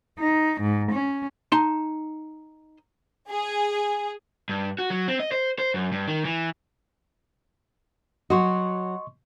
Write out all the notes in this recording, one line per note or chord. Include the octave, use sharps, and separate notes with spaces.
D#4
G#2
C#4
D#4 A5 C6
G#4
G2
F#4
F#3
C4
D#5
C5
C5
F#2
G2
D#3
E3
F#3 F#4 D#5 C6 C#6